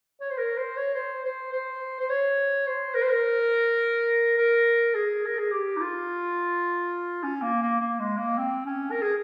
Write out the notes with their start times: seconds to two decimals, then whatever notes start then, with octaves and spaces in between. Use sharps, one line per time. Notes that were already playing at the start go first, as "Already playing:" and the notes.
0.20 C#5
0.30 C5
0.38 A#4
0.57 C5
0.77 C#5
0.95 C5
1.24 C5
1.52 C5
1.99 C5
2.09 C#5
2.66 C5
2.94 A#4
3.02 C5
3.08 A#4
4.38 A#4
4.95 G#4
5.26 A#4
5.38 G#4
5.51 G4
5.76 D#4
5.81 F4
7.23 C#4
7.42 A#3
7.62 A#3
7.80 A#3
7.99 G#3
8.17 A#3
8.38 C4
8.65 C#4
8.91 A#4
9.02 G#4